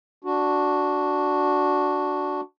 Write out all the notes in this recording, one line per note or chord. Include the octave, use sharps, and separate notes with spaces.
D4 F#4